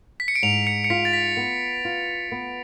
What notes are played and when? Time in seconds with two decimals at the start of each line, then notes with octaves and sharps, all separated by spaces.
0.20 B6
0.28 C#7
0.35 D7
0.43 G#2 F7
0.67 C#7
0.84 C#7
0.90 F4 B6
1.05 A6
1.13 B6
1.37 B3
1.85 F4
2.32 B3